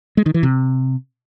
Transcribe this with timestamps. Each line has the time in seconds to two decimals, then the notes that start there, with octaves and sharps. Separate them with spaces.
0.17 G#3
0.26 D#3
0.34 E3
0.43 C3